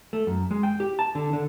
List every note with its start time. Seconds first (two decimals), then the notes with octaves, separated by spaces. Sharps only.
0.13 A3
0.27 F#2
0.51 G#3
0.63 G5
0.80 G4
0.99 A5
1.15 D3
1.33 D3